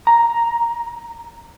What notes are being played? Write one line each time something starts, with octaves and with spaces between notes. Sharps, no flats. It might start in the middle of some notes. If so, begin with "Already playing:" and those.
A#5